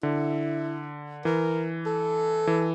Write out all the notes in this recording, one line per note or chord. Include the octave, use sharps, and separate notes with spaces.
D3 E4
E3 A#4
A4
E3